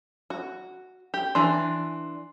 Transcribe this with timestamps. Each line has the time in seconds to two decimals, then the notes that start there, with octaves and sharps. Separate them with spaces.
0.30 F#4
1.14 G4
1.35 E3 D4 C6